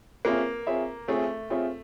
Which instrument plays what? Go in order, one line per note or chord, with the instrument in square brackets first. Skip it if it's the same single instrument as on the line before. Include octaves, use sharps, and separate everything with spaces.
[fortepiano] A#3 [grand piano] C4 F4 G#4 C#5 E5
[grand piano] C4 F4 G#4 C#5 E5
[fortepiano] A3 [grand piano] C4 F4 G#4 C#5 E5
[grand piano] C4 F4 G#4 C#5 E5